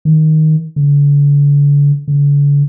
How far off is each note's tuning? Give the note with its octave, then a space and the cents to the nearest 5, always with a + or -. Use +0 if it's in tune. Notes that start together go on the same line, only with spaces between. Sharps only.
D#3 +5
D3 -40
D3 -45